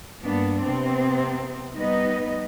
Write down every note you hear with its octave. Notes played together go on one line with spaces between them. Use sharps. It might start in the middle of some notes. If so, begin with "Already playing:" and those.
G2 A#3 B3 D4
C3 B3 C4
G3 B3 D#4 B4 D#5